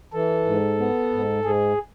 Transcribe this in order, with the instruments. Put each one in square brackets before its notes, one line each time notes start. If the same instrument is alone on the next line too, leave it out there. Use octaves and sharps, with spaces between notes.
[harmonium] E3 [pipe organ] A4
[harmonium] G#2
B3
G#2
[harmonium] G#2 [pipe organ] G#4